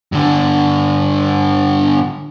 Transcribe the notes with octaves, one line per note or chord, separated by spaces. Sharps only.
G2 D3